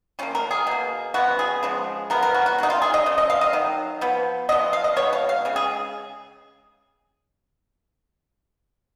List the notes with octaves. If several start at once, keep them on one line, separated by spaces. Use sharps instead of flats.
F3 A#3 C#4
A#4
G#4
B2 A#3
C#3 F3 B3 F#4
G#4
C#3 F3 G#3
F3 G#3 B3 A#4
A#4
F#4
F#4
D#3 A#3 D#4
F4
G#4
D#5
C#3 F3
D#5
F5
D#5
D#3 F#3
F3 B3
F3 B3 D#5
F5
D#5
B2 G#3 C#5
F5
F5
C#3 G#3
G#4